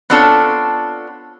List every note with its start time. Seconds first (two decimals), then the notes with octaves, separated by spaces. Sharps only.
0.10 B3 C4 D4 F4 A4 C#5